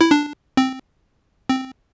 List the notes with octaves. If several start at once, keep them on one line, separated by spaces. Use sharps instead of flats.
E4
D4
C4
C4